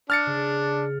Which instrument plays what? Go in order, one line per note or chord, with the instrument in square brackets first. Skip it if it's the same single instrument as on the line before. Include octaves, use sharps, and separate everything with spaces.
[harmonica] D4 [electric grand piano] F6 A6 C#7
[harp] C#3